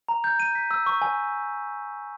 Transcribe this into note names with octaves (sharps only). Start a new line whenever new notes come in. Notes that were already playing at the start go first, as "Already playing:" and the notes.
A#5
G6
D#7
B6
E6
C#6
G#5